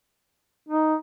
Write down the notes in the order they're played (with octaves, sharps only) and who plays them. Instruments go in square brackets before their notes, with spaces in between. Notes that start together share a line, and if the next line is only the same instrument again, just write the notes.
[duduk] D#4